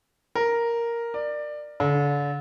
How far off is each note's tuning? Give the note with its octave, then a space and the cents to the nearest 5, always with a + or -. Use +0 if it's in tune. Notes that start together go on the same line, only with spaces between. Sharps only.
A#4 +0
D5 +20
D3 -35